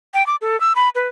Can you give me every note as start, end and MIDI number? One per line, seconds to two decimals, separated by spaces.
0.14 0.26 79
0.27 0.36 86
0.41 0.59 69
0.60 0.73 88
0.76 0.89 83
0.95 1.08 71